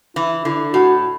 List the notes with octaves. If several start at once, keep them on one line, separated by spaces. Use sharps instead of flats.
E3 E4
D3 E4
A2 F#4